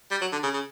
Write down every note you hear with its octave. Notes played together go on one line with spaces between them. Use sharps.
G3
F#3
D3
C#3
C#3